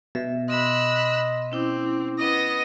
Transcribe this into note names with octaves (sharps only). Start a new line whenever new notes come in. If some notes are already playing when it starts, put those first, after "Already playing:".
B2 E5
D#5 B5 C6 E6 F#6
C4 C#4 E4 D6
B3 D#5 D#6 A#6